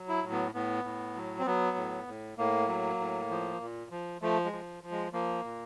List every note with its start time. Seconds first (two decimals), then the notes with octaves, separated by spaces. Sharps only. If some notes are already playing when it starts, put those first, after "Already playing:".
Already playing: F#3
0.09 E4
0.23 A2
0.32 B3
0.54 A2 B3
0.84 A2
1.16 F#3
1.39 C4
1.46 F#3 B3
1.77 A2
2.08 A2
2.38 A2 A#3
2.68 F#3
2.99 A2
3.30 F3
3.60 A#2
3.91 F3
4.22 F3 A3
4.45 G#3
4.53 F3
4.83 F3
4.91 G#3
5.13 F3 A#3
5.44 A#2